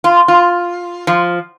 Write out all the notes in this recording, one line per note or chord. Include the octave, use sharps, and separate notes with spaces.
F4
F4
F3